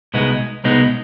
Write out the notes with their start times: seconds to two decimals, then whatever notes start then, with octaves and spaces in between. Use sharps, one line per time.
0.14 C2 B2 G#3 B3 D#4
0.64 C2 B2 G#3 B3 D#4